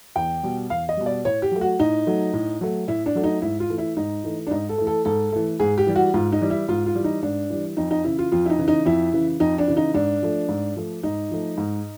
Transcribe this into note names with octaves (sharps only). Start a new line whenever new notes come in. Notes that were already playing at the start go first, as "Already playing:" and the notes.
E2 G5
B2 G3
E2 F5
D#5
B2 G3
D5
A2 C#5
G4
F#3 A3
F#4
A2 D#4
F#3 A3
A2
F#3 A3
A2 E4
D4
F#3 A3
D#4
G#2 E4
F4
E3 A3
E4
G#2 D#4
E3 A3
D4
G#2 D#4
A4
E3 A3
A4
G#2 A4
E3 A3
G#2 G#4
G4
E3 G3
F#4
G#2 F4
D#4
E3 G3
E4
G#2 F4
F4
E3 G3
D#4
G#2 D4
E3 G3
F2 D#4
D#4
C#3 E3 E4
F4
F2 F4
E4
D#4
C#3 E3
D#4
F2 E4
C#3 E3
F2 D#4
D4
C#3 E3
D#4
G#2 D4
F3 A3
G#2
F3 A3
G#2 D#4
F3 A3
G#2